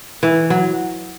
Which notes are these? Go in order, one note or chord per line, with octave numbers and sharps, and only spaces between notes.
E3
F#3